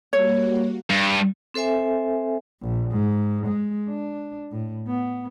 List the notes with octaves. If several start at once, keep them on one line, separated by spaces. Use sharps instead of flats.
G3 A#3 F#4 C#5
G2
C4 A4 C5 E5 G#5
A#1
G#2
G#3
D4
A2
B3